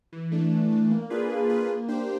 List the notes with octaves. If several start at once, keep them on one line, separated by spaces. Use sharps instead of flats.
E3
A3 D4
E3
A3 D4
A#3
D4 F4 G#4 B4
A#3
D4 F4 G#4 B4
A#3
D4 G4 C5